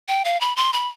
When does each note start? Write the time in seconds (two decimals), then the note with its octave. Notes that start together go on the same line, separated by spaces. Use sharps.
0.08 G5
0.25 F5
0.41 B5
0.57 C6
0.73 B5